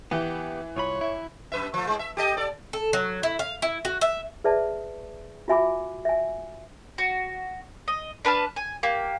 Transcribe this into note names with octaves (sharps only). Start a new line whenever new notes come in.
E3 B3 G4
C2 F4 C#5 B5
E4 E5
F#2 B4 E5
F3 A3
A2 G#3
E5
G4 A4 D#5
A4 D5
A4
F#3
E4
F5
E4
F#4
E5
G#4 B4 D5 E5 A5
F4 F#4 E5 G#5 B5 D6
E5 G#5
F#4
D#5
D4 B4 A5 F6
G#5
A#3 G4